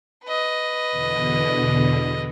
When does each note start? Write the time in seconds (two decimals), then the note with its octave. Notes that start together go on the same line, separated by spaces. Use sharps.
0.25 B4 D#5
0.91 E2 B2 D3